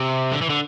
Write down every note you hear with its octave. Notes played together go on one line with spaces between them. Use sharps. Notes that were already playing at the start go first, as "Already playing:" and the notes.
Already playing: C3
D3
E3
D3